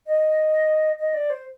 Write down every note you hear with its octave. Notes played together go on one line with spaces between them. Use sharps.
D#5
D#5
D5
C5